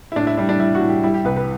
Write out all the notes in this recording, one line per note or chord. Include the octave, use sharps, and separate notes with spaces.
E4
A2 D4
E4
G3 D4
D4
G3 E4
F#4
A2
G4
G3 E4
G4
C2 B4
B4